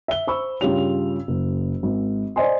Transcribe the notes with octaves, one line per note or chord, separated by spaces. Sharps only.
E5 G7
C5 B5 C#6 E6
G2 C#3 F4 G4 C#5 F7
F#1
G#1
C5 D5 D#5 G#5 C6